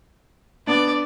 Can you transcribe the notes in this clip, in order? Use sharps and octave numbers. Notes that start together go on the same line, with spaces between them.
B3 D4 D5